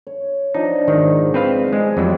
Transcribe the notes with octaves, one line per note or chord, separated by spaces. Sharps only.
C#5
F3 D4 D#4
G#2 D#3
C4 B4 F5
G#3
F2 F#3 G3 C4 B5